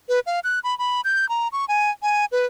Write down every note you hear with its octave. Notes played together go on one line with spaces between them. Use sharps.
B4
F5
F#6
B5
B5
G6
A#5
C#6
G#5
G#5
B4